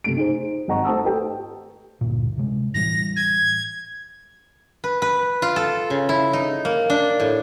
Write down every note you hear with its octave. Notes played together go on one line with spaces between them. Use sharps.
C3 A3 D7
D#4 G#4 C5
G#1 D#5 F#5 A#5 C#6
A3 C5 A5 D#6 E6
G4 A4 B4 G5
D2 G2 A#2
C3 G#3
A2 E3 G3 A#6
G#6
B4
B4
F4
A4
C#3
E4
D#4
A#3
D4
A2